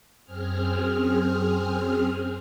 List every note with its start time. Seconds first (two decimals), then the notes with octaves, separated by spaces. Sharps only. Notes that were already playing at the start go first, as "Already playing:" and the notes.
0.24 F#2 C4 G#4 F6